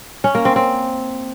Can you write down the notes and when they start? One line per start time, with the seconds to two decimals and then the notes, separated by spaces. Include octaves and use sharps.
0.24 C#4
0.35 A#3
0.45 C4
0.56 C4